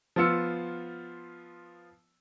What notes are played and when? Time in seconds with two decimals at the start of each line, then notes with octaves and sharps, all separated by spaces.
0.16 F3 B3 F4 E6 C#7